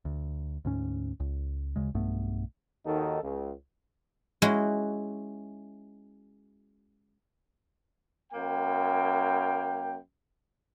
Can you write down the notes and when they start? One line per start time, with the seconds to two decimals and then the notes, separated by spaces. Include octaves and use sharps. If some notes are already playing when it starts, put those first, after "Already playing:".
0.05 D2
0.65 D2 G#2 C#4
1.20 C#2
1.76 D2 C#3 G#3
1.94 B1 G2 A3 B3
2.85 D#2 D#3 D#4 F#4 A4
3.22 C#2
4.42 G#3 C#4 E4 F#4
8.33 F#2 A#3 G5